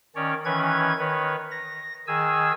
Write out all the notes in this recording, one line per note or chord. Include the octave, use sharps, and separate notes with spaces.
D#3 C#4 C#5 D5
D#3 E3 C#4 B4 C#5 G#6
D#3 B4 C#5
A#6
D#3 G#4 G#5 E6